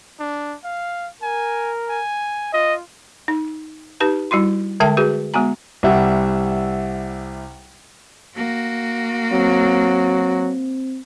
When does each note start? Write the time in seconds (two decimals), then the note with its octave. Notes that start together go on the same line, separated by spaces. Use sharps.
0.20 D4
0.64 F5
1.22 A#4 G#5
1.89 G#5
2.53 F4 D#5
3.28 D#4
4.00 D#4 G4 B4 A5
4.31 G3 E4 F#4 C6
4.80 D3 G#3 A4 E5 G5 A5
4.97 F#4 G#4 B4
5.34 G#3 B3 F#4 G#5 A#5
5.83 C2 G3 E5 F#5
8.35 A#3 F#4
9.32 F#3 C4